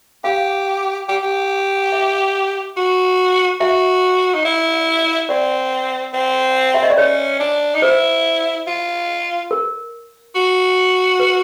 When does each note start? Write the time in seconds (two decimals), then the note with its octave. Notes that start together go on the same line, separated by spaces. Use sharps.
0.24 G4 F5
1.08 G4
1.23 G4
1.92 E5
2.77 F#4
3.60 F#4 E5
4.34 D#4
4.45 E4
5.29 C4 D5
6.14 C4
6.74 E5
6.83 D#5
6.90 D5
6.98 C#4 C#5
7.39 D4
7.74 D#4
7.82 E4 C5
8.67 F4
9.51 A#4
10.35 F#4
11.20 B4